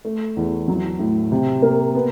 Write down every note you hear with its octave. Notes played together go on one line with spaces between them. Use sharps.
A3
E2
F#3
A2
C3
A#3
B3